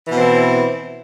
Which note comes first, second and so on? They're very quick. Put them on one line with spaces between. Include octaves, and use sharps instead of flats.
E3 B2 C4 E4